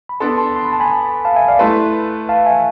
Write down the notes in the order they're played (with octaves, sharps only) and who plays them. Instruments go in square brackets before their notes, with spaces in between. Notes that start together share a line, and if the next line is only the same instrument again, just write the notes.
[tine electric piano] B5
[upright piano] B3 D4 A4 [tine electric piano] A5 C6
[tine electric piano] A5 C6
C6
B5
A5
G#5 B5
F5 A5
E5 G#5
D5 F5
[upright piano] A3 E4 B4 [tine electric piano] A5 C6
[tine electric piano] F5 A5
E5 G#5